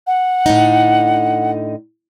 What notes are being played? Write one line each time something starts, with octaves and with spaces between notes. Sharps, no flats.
F#5
A2 D3 D#4